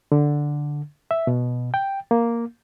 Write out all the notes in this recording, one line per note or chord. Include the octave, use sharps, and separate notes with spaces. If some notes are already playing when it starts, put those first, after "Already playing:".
D3
E5
B2
G5
A#3